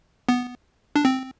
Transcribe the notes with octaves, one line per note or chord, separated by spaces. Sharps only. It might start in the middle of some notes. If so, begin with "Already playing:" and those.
B3
D4
C4